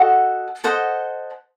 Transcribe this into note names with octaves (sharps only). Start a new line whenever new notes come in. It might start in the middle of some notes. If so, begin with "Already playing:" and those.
Already playing: F#4 A4 D#5 F#5
A4 C5 D#5 F#5